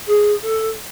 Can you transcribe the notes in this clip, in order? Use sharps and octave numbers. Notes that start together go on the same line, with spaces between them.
G#4
A4